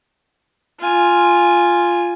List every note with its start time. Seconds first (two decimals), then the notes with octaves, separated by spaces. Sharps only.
0.80 F4 G#5